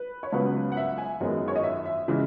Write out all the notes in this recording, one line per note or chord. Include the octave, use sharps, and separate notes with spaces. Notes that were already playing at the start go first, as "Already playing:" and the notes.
Already playing: B4
C#5
C#2 C#3 F#3 B3 B4
F#5
E5
G#5
F#2 D#3 G#3 B3
C#5
D#5
E5
E5
C#3 E3 G#3